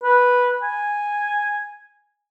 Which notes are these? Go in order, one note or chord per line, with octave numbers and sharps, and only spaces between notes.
B4
G#5